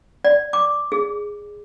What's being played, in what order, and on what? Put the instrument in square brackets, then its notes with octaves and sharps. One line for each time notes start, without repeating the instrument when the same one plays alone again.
[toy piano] D5
D6
G#4